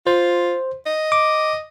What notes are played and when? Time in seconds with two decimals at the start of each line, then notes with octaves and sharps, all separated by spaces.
0.07 F4 C5
0.86 D#5
1.12 D6